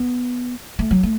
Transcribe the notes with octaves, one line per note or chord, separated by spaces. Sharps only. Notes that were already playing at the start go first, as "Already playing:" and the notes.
Already playing: B3
A3
F#3
A3